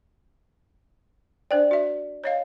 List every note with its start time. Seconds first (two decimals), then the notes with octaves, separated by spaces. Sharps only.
1.51 D4 C5 D5 G5
1.71 F#4 E5
2.24 C#5 D#5 F5